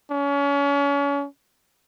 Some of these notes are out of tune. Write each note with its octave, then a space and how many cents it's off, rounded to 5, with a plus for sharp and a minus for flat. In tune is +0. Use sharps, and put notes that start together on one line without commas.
C#4 +35